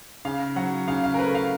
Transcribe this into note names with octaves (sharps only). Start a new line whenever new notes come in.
C#3 F5
F#3 F#5
C#3 F5
F5
A#4
A3 B4
F5